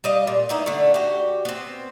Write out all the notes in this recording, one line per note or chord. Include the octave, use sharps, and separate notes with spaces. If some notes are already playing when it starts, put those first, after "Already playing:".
G3 D#5 F5
A#2
B3 D#4 E4
D3 A3
F#4 G4
B3 C4